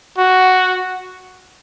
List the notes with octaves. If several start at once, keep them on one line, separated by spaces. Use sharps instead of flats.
F#4